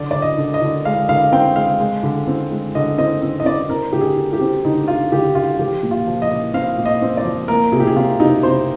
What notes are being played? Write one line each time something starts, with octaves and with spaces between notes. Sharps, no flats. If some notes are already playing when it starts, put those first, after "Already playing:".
Already playing: D3 D5
D3 D5
D#5
D3
D#5
D3
G#3 F5
D3 F5
C4 G5
G#3 F5
G#3
D3
C4
G#3
D3 D#5
C4 D#5
C4
D#5
C4 D5
C4 A#4
D3 G4
G#4
D3
G4
C4
D3 D#4
D3 F4
D3 G4
D3 F4
F3 G4
A#2
F4
F3
D#5
A#2
C4 F5
A#2
D#5
C4
D5
F3
A#3 A#4
C3 G#4
G4
G#4
C3 F4
C3 D#4
C3 C5